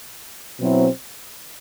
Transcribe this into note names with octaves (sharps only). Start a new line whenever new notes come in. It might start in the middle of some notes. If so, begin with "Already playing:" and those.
B2 F#3 C4 E4